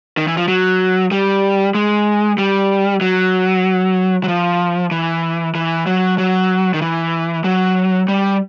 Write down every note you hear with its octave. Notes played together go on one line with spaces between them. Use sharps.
D#3
E3
F3
F#3
G3
G#3
G3
F#3
F#3
F3
E3
E3
F#3
F#3
D#3
E3
F#3
G3